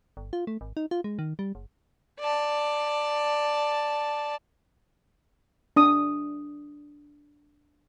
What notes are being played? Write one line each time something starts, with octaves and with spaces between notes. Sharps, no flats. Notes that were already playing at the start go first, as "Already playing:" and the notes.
G1
F4
A3
G#1
D#4
F4
G#3
D#3
G3
F#1
D5 A5
D4 D#6